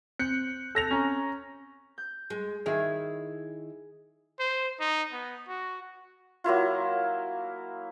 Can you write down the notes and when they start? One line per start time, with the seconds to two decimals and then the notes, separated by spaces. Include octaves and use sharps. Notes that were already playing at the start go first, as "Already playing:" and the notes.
0.19 C4 F#6 G6 C#7
0.75 A4 A#6 F7
0.91 C#4 A#5
1.98 G6
2.30 G#3
2.66 D#3 E4 G#4 F5
4.39 C5
4.80 D#4
5.13 B3
5.48 F#4
6.44 F#3 A#3 E4 F4